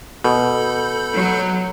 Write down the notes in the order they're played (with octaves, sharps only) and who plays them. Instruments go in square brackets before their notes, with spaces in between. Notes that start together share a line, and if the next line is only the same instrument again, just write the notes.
[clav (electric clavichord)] B2 [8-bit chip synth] A4 B5 G6
[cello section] F#3